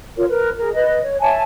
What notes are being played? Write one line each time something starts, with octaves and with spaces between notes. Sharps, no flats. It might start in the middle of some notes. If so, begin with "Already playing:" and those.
F4 A#4 C#5
A#4 B4
G#4 A#4
B4 D#5
C#5
C#5 E5 G#5 A5